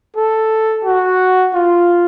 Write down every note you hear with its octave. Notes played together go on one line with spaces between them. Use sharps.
A4
F#4
F4